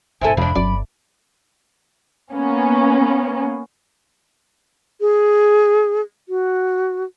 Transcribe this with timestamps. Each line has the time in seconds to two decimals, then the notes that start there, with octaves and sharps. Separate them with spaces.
0.21 D1 G2 C3 E4 A4 G#5
0.37 F1 F2 D4 B5
0.55 G1 F#2 D5
2.32 A#3 B3 C#4
5.01 G#4
6.29 F#4